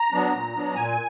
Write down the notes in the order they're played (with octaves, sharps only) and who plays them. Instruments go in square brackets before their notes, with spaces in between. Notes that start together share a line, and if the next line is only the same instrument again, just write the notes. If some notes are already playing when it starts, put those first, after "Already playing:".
Already playing: [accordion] A#5
F#3 B3 D4
A#2
F#3 B3 D4
A#2 G#5